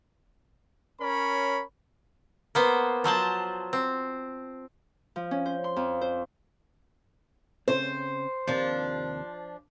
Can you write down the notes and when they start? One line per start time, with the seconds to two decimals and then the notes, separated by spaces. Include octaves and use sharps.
1.01 C#4 A#4 C#5 B5
2.55 A#3 B3 C5
3.04 F3 F#3 C5 A5
3.73 C4
5.16 F3
5.31 C#4
5.46 C5
5.64 C6
5.76 F2
6.01 C5
7.68 C#3 C4 C5
8.47 D#2 C3 F3 A#3 D4